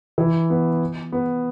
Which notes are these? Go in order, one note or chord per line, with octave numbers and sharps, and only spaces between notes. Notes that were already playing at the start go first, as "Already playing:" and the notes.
E3
B3
B3